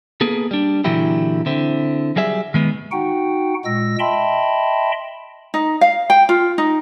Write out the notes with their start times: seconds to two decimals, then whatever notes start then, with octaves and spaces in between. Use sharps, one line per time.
0.21 A#3 B3 G#4 A4
0.51 G3 D4
0.84 A#2 D3 E3 F#3 E4 G4
1.46 D3 C4 E4
2.16 F#3 G3 G#4 E5
2.54 D#3 G#3 B3
2.92 D#4 F#4 F#5 G5
3.65 A#2 G#3 E6 A#6
3.99 D#5 E5 G5 A5 B5 C6
5.54 D#4
5.81 F5
6.10 G5
6.29 F4
6.58 D#4